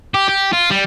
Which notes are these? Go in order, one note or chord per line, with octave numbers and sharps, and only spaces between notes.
G4
G4
F4
G3